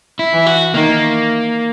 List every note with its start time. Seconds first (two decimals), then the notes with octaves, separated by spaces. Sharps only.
0.19 E4
0.33 E3
0.46 F#4
0.74 D#3 A#3